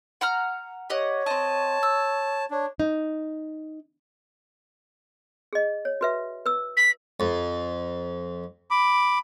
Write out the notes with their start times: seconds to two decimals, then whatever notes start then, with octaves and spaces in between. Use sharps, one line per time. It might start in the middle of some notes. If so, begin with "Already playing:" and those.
0.21 F#5 A#5 F6
0.90 G4 C#5 D#5 F#5
1.26 C4 D#5 A5
1.83 E6
2.51 D4 C#5
2.80 D#4
5.53 G#4 D#5
5.85 C#5
6.01 F#4 B4 E5
6.46 B4 E6
6.77 B6
7.20 F2
8.71 B5 D6